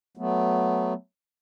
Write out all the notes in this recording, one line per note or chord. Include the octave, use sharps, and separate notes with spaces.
F#3 A3 B3